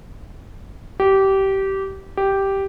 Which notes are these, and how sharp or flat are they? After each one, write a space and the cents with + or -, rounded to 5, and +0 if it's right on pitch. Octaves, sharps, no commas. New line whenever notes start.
G4 -20
G4 -5